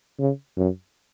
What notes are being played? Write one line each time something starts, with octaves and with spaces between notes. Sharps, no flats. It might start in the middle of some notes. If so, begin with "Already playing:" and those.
C#3
F#2